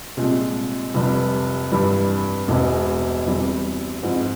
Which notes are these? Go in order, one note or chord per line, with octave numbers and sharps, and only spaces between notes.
C2 A#2 G#3 C4
F1 F2 C3 G3
G2 E3 G3
E1 E2 E3 G#3
E2 E3 G3 C4
G#2 F3 C4 E4